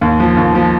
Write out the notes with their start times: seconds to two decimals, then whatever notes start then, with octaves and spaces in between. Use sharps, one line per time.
0.01 D#2
0.20 F3
0.37 D#2
0.55 F3